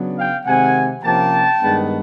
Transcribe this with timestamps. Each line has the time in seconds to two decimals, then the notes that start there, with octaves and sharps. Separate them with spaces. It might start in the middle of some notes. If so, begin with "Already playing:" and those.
Already playing: C#3 F#3 B3 D4
0.17 F5 G5
0.45 C3 D#3 G#3 C4 F#5 G#5
1.03 C3 F3 A#3 C#4 G5 A5
1.61 G2 D#3 G#3 B3 D4